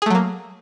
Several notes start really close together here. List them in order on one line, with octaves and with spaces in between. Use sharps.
G#4 A3 F#3 A#3